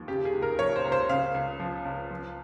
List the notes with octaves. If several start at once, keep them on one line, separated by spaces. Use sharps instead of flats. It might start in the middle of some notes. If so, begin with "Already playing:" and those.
Already playing: D#2 F3
C#3 G4
G#4
C#2
A#4
F3 C#5
C5
C#2
C5
C#3 F5
C#2
F3
C#2
F3